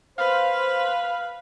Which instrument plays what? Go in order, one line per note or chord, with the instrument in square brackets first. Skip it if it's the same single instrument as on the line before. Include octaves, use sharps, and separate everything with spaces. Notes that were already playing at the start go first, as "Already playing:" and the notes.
[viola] B4 [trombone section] C5 [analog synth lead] F5